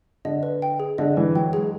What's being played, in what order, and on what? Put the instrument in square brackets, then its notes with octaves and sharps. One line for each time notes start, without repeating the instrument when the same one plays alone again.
[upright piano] D3 [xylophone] D#5
[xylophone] B4
G5
G#4
[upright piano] D3 [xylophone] D#5
[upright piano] E3 [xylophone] B4
[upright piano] F#3 [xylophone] G5
[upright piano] G#3 [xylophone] G#4